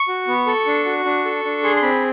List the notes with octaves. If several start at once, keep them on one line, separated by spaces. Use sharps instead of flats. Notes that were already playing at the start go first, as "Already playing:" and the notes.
Already playing: C#6
F#4
B3
A4
D4
F#4
D4
A4
D4
G#4 C6
C6
C4 B5